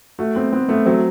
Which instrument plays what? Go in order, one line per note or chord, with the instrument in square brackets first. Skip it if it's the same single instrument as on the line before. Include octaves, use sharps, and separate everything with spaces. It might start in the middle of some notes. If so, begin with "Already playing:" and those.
[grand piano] A3 [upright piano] F#4
[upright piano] B3 [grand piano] C4
[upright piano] B3 [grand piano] C4
[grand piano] A3 [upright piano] B3
[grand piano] F#3 [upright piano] C4